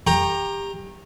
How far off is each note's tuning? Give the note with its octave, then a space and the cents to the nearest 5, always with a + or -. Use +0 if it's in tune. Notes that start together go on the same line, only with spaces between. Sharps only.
G4 +20 A#5 +0 C#6 -25